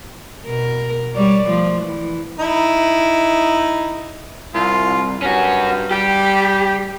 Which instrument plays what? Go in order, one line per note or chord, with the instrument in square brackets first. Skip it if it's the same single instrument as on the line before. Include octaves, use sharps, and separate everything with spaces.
[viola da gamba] B2 A#4
G3 C#5 D5
F3 A3
E3
[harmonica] D#4 E4
[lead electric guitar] C2 [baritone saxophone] F4
[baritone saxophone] G2 [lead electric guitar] C#4 F#4
[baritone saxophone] G3 [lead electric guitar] G4